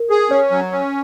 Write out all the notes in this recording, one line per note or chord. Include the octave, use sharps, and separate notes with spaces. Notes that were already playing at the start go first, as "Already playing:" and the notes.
Already playing: A#4
G#4
C#4 C#5
F#3
C#4